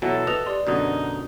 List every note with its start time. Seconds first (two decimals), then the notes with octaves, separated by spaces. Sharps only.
0.02 B2 E3 F#3 A4
0.27 B4 D#5 F7
0.46 G4 D5 C6
0.67 F#2 B2 D3 D#4